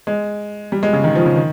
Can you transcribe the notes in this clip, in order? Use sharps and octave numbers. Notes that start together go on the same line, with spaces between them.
G#3
G3
G#3
C#3
D#3
F3
C#3
D#3